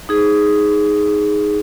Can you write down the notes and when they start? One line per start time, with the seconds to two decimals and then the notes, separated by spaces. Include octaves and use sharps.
0.09 D#4 G#4